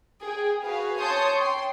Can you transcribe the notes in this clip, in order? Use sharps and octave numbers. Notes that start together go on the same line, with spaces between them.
G#4 G5
F#4 G#4 B4 F5
C#5 A5 C6 C#6 D#6 G6
G5 C6